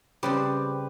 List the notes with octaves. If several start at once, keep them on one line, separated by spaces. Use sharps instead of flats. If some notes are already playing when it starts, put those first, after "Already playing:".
C#3 G3 C4 G4 B4